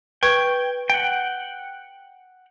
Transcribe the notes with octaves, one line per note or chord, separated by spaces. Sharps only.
B4 G5 C#6 G#6
F#5 G5